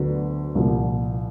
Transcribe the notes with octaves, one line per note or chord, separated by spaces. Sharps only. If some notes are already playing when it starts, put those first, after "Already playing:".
Already playing: D2 D3 F#3 B3
C2 A#2 F3